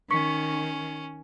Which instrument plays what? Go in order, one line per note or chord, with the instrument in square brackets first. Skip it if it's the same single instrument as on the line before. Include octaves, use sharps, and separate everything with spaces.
[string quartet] D#3 [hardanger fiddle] C#4 [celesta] C#6 B6 C#7